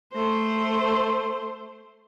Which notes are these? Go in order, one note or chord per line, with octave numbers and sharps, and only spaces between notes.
A3 C5